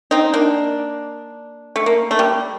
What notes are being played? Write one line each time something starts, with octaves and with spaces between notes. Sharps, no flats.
C4 D#4
A#3 D4
A3
A#3
A3
G3